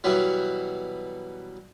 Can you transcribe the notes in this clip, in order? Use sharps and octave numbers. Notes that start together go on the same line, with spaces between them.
B2 E3 F#3 G3